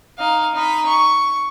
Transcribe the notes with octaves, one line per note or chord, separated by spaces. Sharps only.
D#4 F5
D#4 B5
C#6